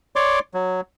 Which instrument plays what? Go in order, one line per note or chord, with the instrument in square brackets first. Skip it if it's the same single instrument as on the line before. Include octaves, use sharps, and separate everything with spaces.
[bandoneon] C#5 D5 C6 D6
F#3